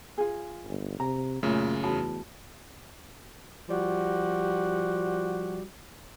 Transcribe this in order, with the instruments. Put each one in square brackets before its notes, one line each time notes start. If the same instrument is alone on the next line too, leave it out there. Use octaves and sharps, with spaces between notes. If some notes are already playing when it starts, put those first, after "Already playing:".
[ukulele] F4 G#4
[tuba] G1
[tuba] C3 [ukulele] A#5
[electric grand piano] F#2 C#3 [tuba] A#2 [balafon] A3 F4
[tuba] E2 [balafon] F#4 B5 [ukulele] A5
[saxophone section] F3 G3 F#4